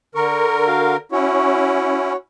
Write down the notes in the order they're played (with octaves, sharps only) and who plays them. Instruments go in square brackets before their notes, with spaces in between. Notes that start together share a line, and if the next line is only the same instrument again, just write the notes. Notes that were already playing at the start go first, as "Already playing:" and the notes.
[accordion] D3 A#4 [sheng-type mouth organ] C#6
[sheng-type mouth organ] F#4 F5
[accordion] C#4 E4 [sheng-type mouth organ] F#4 C#5